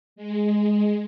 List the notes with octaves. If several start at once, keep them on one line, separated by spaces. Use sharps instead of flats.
G#3